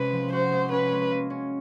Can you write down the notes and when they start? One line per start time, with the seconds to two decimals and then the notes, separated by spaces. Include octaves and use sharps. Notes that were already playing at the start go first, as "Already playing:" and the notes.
Already playing: C3 G#3 C#4 B4
0.13 F3
0.33 F#4 C5
0.52 G#3
0.72 C#4 B4
0.92 G#3
1.11 A#3
1.30 C#4